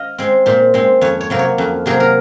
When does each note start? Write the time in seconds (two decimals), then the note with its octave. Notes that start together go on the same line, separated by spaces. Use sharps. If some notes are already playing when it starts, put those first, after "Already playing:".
Already playing: D#5 F5
0.18 G#3 C4
0.46 A#2 C5
0.74 G#3 C4
1.01 F2 C#5
1.21 C#5
1.30 C3 F#3 A#3
1.39 C#5
1.58 F2
1.86 C3 F#3 A#3 G#4
2.00 A#4